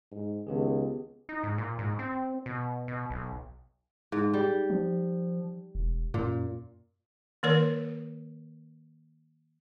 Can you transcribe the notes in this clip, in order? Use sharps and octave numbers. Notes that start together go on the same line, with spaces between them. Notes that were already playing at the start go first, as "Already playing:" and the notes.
G#2
C#2 D#3 B3 G4 G#4
D#4
G#2
A#2
G#2
C4
B2
B2
B1
G#2
G3
F3
E1
F#2 A#2
D#3 A#3 A#4 C#5 D5